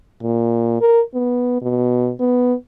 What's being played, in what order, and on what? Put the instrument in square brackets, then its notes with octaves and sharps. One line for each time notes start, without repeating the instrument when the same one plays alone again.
[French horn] A#2
A#4
B3
B2
B3